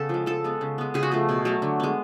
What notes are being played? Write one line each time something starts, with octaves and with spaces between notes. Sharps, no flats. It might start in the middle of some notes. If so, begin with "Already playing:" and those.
Already playing: C#3 B3 A4
F3 G#3
F3 A4
G#3 B3
C#3
G#3 B3
C#3 G#4
F#4
F3 A3 G#4
B2
F#3 A3
D3
G#3 B3